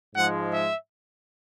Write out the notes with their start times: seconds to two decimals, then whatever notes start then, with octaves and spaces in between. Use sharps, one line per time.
0.14 G#2 F3 G#3 F#5
0.53 E5